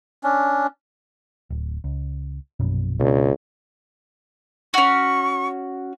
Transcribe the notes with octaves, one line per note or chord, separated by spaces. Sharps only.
C#4 D4
D1
C#2
A#1 F#2 B2
C#2 B2 C4 D4
C#4 F#4 C#6